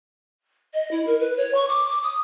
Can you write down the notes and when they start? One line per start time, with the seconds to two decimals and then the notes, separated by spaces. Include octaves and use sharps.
0.74 D#5
0.91 E4
1.06 A#4
1.20 B4
1.37 C#5
1.55 C#6
1.68 D6
1.90 D6
2.03 D#6